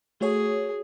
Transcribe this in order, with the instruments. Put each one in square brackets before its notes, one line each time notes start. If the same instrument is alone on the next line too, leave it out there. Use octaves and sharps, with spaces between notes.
[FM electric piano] A3 F#4 C#5 [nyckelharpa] G#4